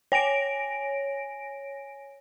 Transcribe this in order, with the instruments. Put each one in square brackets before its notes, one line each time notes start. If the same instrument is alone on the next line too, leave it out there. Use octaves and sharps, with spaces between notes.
[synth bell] C#5 G#5 A#6 D7